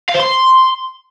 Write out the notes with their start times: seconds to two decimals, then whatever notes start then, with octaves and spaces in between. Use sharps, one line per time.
0.09 F5
0.15 C5
0.20 C6